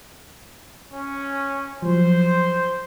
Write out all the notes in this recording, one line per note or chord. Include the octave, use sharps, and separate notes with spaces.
C#4
F3 F#3 C5